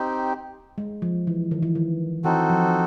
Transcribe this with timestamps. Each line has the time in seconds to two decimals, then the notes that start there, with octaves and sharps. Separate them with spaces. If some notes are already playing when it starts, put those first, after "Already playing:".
Already playing: C4 D#4 G4
0.78 G#3
1.02 F3
1.27 E3
1.51 D#3
1.63 E3
1.75 D#3
2.24 E3 C4 D#4 F#4 A4
2.50 F3